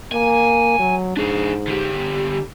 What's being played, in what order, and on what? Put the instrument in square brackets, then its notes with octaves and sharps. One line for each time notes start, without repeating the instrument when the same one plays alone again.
[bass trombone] A#3 [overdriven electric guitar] G#5
[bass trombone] F#3
[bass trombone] G#2 [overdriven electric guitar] D4 G#4
[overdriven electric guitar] D3 G4